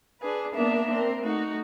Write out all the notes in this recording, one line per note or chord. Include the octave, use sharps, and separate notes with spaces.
D4 G#4 B4
A#3 B3 D4 A#4 E5
C4 A#4
A3 D#4 F#4